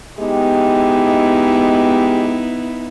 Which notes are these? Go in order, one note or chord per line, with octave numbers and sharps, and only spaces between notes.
G#3 B3 D#4 E4 G4